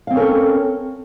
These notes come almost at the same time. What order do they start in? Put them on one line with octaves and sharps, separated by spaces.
F5 C4 C#4 A#4 A4